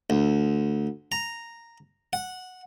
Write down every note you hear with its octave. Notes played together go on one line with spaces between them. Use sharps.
D2
A#5
F#5